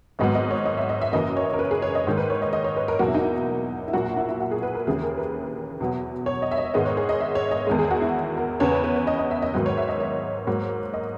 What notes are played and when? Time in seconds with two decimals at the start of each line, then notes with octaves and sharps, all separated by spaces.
0.19 G#1 G#2 F#3 B3 D#5
0.35 D#5
0.51 C#5
0.65 D#5
0.77 E5
0.89 D#5
1.01 E5
1.12 F#1 F#2 E3 A#3 D#5
1.37 C#5
1.53 A#4
1.59 B4
1.71 G#4
1.82 C#5
1.95 D#5
2.07 G#2 D#3 A#3
2.17 B4
2.30 C#5
2.42 D#5
2.53 D#5
2.64 C#5
2.77 B4
2.88 A#4
2.99 E2 B2 F#3 A#3 F#4
3.08 E4
3.15 D#4
3.22 E4
3.88 E4
3.93 A#1 A#2 F#3 A#3 F#4
4.17 E4
4.29 E4
4.40 F#4
4.51 G#4
4.63 B4
4.75 A#4
4.87 D#2 C#3 E3 G#4
5.02 A#4
5.18 B4
5.80 E2 B2 F#3 B3
6.26 C#5
6.42 D#5
6.51 E5
6.58 D#5
6.74 G#2 D#3 G#3 B3 D#5
6.86 C#5
6.97 G#4
7.09 D#5
7.20 E5
7.35 C#5
7.51 D#5
7.67 E2 D#3 G#3
7.79 G#4
7.91 F#4
8.02 E4
8.37 A#4
8.60 E2 C#3 E3 B3 C#5
8.72 B4
8.84 B4
8.96 C#5
9.07 D#5
9.19 D#5
9.31 E5
9.42 D#5
9.53 G#2 D#3 F#3 B3 B4
9.66 C#5
9.77 E5
9.89 D#5
10.00 C#5
10.47 G#2 F#3 A#3
10.94 D#5